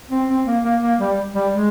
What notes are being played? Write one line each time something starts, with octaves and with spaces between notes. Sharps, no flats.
C4
C4
A#3
A#3
A#3
G3
G3
G#3